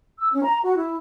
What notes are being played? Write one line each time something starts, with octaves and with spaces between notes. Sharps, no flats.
E6
C#4
A#5
F#4
E4